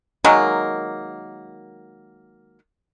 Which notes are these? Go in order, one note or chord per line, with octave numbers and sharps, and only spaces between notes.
D#3 F#3 G#3 A#3